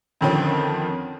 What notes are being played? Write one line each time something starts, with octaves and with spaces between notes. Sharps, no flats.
F2 D3 D#3 F3 C4 C#4